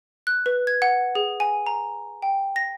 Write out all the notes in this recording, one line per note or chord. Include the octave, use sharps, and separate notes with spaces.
F#6
B4
G#6
F#5
G#4
G#5
A#5
G5
A#6